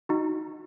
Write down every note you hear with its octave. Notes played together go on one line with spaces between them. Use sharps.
D#4 F#4